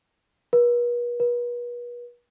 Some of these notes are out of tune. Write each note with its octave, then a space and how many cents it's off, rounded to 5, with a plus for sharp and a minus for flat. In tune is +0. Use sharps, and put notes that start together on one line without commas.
B4 -45
B4 -40